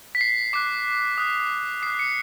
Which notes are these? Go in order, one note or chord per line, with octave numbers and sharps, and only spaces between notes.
B6
C7
D6 F#6 C7
D#6 F#6
D#6 F#6 C7
C#7